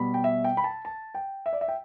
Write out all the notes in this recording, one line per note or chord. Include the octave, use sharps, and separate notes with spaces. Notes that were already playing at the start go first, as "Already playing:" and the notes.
Already playing: B2 G3 B5
G5
E5
G5
B5
A5
A5
G5
E5
D5
E5
G5